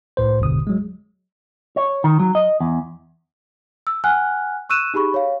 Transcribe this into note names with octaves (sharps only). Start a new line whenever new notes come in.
C2 A2 B4 C5
G#1 E2 G#2 B2 D3 D#6
F#3 G#3
C#5
D#3
F#3
D#5
E2
E6
F#5 G#5 F6 F#6
C#6 E6 F#6 D#7 E7
D#4 G4 G#4 B5 C#6
C#5 F5